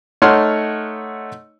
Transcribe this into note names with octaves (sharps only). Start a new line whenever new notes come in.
A3 D#4 C#5 F#5 C6 F6